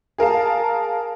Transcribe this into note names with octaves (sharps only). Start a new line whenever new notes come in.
G#4 A#4 F5 A5